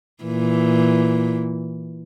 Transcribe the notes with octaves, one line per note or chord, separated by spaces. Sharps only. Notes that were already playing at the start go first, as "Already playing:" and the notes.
A#2 E3